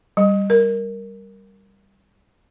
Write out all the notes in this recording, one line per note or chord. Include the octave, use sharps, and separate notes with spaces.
G3
A#4